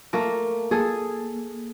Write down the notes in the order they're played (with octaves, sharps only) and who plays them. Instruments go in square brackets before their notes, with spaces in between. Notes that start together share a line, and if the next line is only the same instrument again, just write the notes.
[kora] A3 A#3 A#4
[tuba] A#3 [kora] G#4 A4